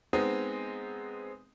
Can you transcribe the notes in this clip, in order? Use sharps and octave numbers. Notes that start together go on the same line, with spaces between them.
G#3 B3 C4 D#4